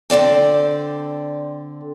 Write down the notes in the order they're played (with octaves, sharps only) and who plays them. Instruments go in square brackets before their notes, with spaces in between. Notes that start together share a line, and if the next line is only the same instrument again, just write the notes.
[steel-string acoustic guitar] D3 C4 D5 G5